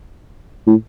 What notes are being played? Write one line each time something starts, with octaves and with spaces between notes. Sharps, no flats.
A2